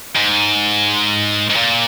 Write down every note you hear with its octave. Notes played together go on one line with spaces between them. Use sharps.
G#2
G#2
A#2